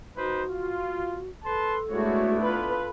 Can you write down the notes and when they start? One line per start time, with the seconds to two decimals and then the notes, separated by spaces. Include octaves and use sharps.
0.17 D#4 F#4 B4 C5
0.51 F4
1.44 A4 B4 A5 C6
1.90 G#3 A3 B3 D4 E4 F#4 C#5
2.40 F4 A4 B4